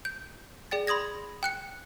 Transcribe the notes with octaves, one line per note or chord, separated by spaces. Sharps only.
G6
G#4 D5 G5 A6
B5 C6 D#6 G#6 A#6
G5 F#6 C#7